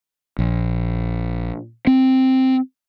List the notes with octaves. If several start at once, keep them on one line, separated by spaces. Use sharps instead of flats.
A#1
C4